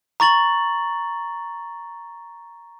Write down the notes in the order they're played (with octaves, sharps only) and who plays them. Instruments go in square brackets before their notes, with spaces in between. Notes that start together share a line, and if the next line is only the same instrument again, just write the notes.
[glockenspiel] A#5 C#6 A6 F#7